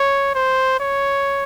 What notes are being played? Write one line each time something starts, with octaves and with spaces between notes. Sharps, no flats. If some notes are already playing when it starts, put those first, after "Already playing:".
Already playing: C#5
C5
C#5